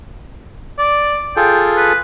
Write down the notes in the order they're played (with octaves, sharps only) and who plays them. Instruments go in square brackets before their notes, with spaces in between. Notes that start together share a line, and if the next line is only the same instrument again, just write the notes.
[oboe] D5
[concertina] F4 G#4 A4 [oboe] G5
[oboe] B4